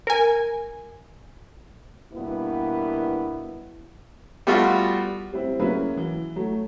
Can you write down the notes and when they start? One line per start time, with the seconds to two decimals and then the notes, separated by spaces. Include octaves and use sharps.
0.07 A#4 G#5
2.13 G2 B2 A#3 B3 E4
4.47 G3 A3 B3 F4 F#4 A4
5.32 G3 C4 E4
5.60 C#3 F#3 A#3 E4 B4
5.97 E3
6.36 F#3 A3